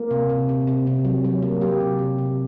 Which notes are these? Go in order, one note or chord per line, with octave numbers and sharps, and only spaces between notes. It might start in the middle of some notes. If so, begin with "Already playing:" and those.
Already playing: A#3
C3
C3
C3
C3
C3
F#3
F#3
A#3
F#3 G4
C3
C3
C3